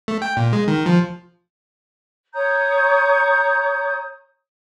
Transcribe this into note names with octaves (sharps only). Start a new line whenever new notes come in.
A3
G5
A#2
G#3
D#3
F3
C#5 A#5 D#6 G6